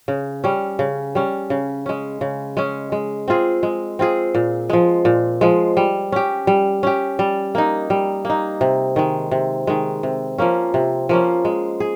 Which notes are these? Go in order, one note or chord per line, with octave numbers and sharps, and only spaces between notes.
C#3
G3 C#4
C#3
G3 C#4
C#3
G#3 C#4
C#3
G#3 C#4
G#3
C4 F4 G#4
G#3
C4 F4 G#4
A#2
F3 G#3
A#2
F3 G#3
G3
C#4 G4
G3
C#4 G4
G3
A#3 D#4
G3
A#3 D#4
C3
D#3 G#3
C3
D#3 G#3
C3
F3 A#3 C#4
C3
F3 A#3 C#4
G#3
G#4